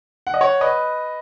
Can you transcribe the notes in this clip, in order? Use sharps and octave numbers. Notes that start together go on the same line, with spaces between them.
F#5
D#5
C#5 F#5
B4 D#5